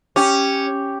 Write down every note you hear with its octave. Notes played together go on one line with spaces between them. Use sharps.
C#4 G4